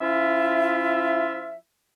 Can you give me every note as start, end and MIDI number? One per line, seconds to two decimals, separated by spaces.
0.01 1.55 53
0.01 1.55 61
0.01 1.55 64
0.01 1.55 65
0.01 1.55 76